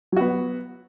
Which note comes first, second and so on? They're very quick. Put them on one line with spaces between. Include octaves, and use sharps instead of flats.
F#3 F#4 B3